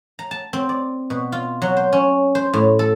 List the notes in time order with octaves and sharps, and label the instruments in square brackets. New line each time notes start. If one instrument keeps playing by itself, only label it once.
[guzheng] A#5
A5
C4
D5
B2
F4
F#3
C5
C#4
C5
A2
A4